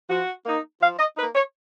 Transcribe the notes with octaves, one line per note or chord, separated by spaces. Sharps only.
F3 F#4
A#3 D#4
F3 F5
D#5
A#3 D#4 B4
C#5